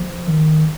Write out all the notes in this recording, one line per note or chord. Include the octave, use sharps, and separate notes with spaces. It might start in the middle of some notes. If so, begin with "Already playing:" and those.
Already playing: F3
D#3